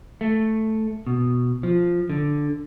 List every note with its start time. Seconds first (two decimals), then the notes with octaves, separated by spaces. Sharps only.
0.21 A3
1.07 B2
1.63 F3
2.10 D3